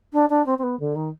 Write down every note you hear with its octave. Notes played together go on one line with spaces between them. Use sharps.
D4
D4
C4
C4
B3
D3
D#3